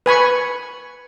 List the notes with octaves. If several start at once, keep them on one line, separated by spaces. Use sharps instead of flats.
B4 G#5 B5 C#6